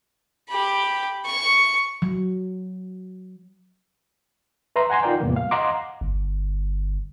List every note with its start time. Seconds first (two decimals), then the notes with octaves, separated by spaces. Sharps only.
0.49 G4 B5
1.26 C#6
2.02 F#3
4.76 B4 E5 A#5 C6
4.90 F#5 G#5 A#5 C6
5.03 D#4 F4 A#4 D5 G5
5.20 E2 A2 C3 G3 A#3 B3
5.36 F5
5.51 D#5 F5 F#5 A#5 C6 D6
6.01 G1